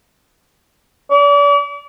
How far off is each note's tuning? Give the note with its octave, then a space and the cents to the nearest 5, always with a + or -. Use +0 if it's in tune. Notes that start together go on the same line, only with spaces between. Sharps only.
D5 -40